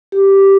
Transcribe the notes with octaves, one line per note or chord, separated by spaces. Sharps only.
G4